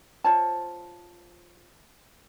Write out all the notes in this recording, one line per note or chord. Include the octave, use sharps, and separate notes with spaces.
F4 C5 C#5 A5